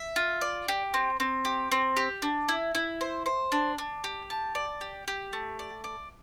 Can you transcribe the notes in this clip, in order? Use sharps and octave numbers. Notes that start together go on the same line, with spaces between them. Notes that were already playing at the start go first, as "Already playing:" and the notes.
Already playing: E5
F4
D5
G4
C4
C4
G4
C4
G4
D4
E4
E4
C5
C5
D4
D4
G4
A5
D5
G4
G4
A3
D5
D5